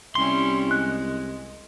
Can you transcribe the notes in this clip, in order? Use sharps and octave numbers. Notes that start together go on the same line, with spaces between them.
C2 G3 C#4 E4 C6
G#3 F#6